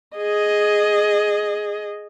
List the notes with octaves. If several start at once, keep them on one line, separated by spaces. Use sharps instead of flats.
G#4 D#5